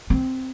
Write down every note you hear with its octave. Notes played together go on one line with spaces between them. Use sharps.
C4